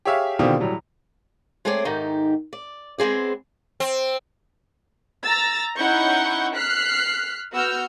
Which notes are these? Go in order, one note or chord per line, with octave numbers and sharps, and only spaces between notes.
G4 G#4 C#5 E5 F5
B2 D3 D#3 C4 F4 G4
A2 F#3 G3
G#3 A3 C4 G#4 C#5 D5
G#2 D#3 D#4 G4
D5
G#3 B3 C4 G#4 D5
C4
A#5 E6 A6
C#4 D#4 E4 F#5 C#6 G6
F6 F#6 B6 C7
B3 F#4 E6 F6 G6